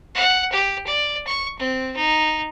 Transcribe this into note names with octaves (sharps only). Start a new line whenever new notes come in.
F#5
G4
D5
C#6
C4
D#4